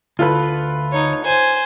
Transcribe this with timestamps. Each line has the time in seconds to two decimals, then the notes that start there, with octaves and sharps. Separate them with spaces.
0.19 D2 F4 A4 B4
0.92 D#4 C#5
1.24 C5 G#5